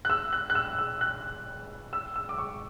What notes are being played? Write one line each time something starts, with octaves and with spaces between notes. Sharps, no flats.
F#6
E6
F#6
F#6
E6
E6
F#6
E6
E6
D6
C#6